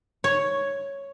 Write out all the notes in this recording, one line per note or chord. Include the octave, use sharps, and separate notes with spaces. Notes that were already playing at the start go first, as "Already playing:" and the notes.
C#5